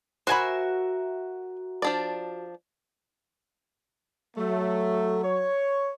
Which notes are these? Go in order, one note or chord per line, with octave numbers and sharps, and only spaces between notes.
F#4 A#4 C5 E5 G#5 B5
F3 D4 D5
F#3 A3
C#5